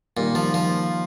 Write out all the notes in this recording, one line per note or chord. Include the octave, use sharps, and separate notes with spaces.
A#2 D#3 G3 A#3 D#4
F3
F3